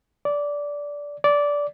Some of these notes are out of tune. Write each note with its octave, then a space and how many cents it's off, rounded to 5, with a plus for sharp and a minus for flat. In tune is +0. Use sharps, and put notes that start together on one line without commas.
D5 -15
D5 -15